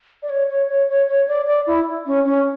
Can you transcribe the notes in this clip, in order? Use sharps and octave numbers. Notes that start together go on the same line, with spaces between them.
D5
C#5
C#5
C#5
C#5
C#5
D5
D5
E4
C#4
C#4